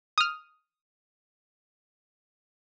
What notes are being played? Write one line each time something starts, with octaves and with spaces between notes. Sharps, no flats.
D#6 F6